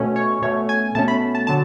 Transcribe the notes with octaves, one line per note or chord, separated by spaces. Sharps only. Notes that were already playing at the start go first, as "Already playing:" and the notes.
Already playing: B2 A3 C#4
C#5
B2 A3 C#4 C#5
G#5
B2 A3 C#4 A5
B5
A5
D3 F#3 A5